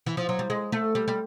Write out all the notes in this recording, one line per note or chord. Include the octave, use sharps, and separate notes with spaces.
E3
F3
F#3
G3
G#3
A3
G3
G3